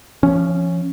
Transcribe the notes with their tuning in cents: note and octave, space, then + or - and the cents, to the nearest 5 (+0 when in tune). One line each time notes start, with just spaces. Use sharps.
F3 -30 C#4 +0